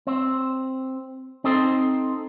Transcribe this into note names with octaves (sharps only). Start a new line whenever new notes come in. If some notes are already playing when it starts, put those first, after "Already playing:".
C4
C4 D#4 A4 C5